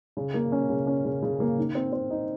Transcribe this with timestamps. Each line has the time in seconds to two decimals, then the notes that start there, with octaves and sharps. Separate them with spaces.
0.17 C#3
0.34 A#3
0.52 C#4
0.70 C#3
0.87 C#4
1.05 C#3
1.23 C#3
1.40 A#3
1.57 D#3
1.75 C4
1.93 C4
2.10 D#4